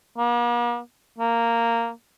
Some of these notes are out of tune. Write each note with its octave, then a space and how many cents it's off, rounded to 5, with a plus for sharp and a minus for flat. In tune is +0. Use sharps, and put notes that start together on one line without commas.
A#3 +45
A#3 -10